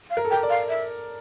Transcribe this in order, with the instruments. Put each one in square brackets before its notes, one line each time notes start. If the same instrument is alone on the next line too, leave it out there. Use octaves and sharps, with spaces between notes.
[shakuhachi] F5
[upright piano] A#4
A4
[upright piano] A#4 [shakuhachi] G5
[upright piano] D5
[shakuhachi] F5
E5